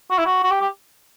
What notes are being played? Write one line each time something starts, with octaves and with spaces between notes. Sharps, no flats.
F#4
E4
F#4
F#4
G4
G4